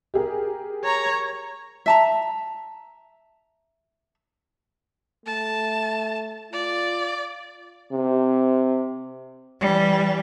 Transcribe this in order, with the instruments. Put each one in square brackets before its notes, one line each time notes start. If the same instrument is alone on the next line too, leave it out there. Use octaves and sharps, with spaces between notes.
[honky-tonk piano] G4 G#4 A#4
[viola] C#5 A#5
[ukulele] E5 A5 A#5
[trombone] A3 [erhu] A5
[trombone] F4 [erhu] D5
[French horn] C3
[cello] E3 G3